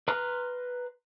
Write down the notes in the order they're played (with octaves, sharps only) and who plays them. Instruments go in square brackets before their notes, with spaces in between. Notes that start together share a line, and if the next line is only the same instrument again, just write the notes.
[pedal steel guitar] B4 A#5 C6 F6 F#6